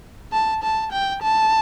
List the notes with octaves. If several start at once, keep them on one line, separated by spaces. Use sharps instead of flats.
A5
A5
G5
A5